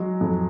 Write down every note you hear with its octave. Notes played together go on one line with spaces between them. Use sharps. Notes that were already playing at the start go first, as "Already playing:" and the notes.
Already playing: F#3 G#3
F2